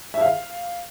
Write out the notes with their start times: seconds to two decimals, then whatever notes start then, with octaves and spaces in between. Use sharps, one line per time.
0.14 E5
0.21 F5